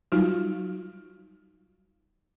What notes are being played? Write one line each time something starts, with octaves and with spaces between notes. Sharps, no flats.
F#3 G3 D#4 F4 F#4